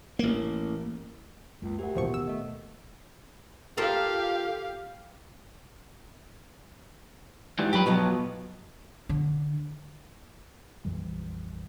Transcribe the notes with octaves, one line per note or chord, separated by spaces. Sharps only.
A1 A#3
C#2 F#2 A#3
D2 G4 A#4 F#5
A1 D#2 B2 F3 C#6
E6
A3 A4 D#5
F4 G4 A4 A#4 F5
G#2 E3 G3
F#3 F4 G4 B4
B2 F3 F#3 B3 D#5
D3
A#1 F2 E3 G3